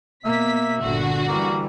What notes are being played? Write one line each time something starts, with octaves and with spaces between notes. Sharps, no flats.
B2 A#3 E5 B6
G1 A#2 D3 F#4
E3 G3 A#3